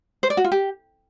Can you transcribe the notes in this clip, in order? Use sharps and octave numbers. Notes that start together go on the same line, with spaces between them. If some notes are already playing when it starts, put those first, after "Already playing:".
C5
D5
F#4
F4
G4